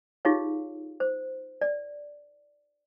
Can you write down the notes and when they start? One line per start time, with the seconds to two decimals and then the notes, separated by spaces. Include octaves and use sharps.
0.25 D#4 F4 G4 G#4 C#5 F5
1.00 C5
1.61 D5